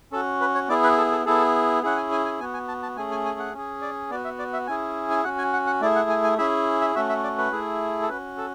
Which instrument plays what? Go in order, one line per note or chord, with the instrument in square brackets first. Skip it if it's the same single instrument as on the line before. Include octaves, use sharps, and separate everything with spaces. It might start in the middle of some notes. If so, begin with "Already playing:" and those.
[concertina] C#4 F#4 A4
B4
C#5
B3 E4 G#4 D5
B4
A4
A4
B3 E4 G#4 A4
C#4 E4 G#4 F#5
G#5
G#5
G#5
B3 F#4 G#5
G#5
A5
A5
A3 C#4 G#4 G#5
G#5
G#5
F#5
C#4 G#4
D5
B3 D5
F#4
E5
D5
E5
C#4 E4 G#4 G#5
G#5
C#4 F#4 F#5
G#5
F#5
F#5
A3 E4 G#4 D5
F#5
G#5
G#5
C#4 E4 G#4 E5
E5
A3 C#4 F#4 E5
E5
D5
B4
A3 E4 G#4
A4
C#4 F#4 B4
A4